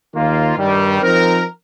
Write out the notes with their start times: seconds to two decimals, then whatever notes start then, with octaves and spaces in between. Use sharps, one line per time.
0.14 D#2 D#3 A#3 F4
0.57 G2 D#3 G3
1.01 F3 C4 D#4 A#4